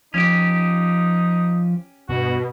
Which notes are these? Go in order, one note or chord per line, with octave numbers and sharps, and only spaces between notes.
F3 C#4 D#4 G4
G2 B2 F#4